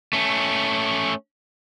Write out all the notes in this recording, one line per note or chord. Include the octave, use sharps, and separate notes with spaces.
A3 C#4